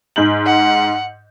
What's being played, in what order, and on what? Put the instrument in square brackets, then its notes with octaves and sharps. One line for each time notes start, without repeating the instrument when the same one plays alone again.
[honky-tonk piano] G#2 G6 F#7
[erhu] F#5